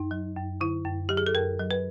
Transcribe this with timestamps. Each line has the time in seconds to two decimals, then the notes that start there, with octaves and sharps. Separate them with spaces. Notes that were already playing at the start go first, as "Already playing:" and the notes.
Already playing: F#2 D#4
0.11 F#3
0.37 F#2
0.61 D3 E4
0.85 F#2
1.09 F#3 G4
1.17 G#4
1.26 A4
1.34 F#2 A#4
1.59 F#3
1.71 B4